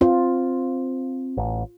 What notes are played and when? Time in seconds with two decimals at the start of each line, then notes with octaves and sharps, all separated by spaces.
0.01 C4 F4
1.37 A1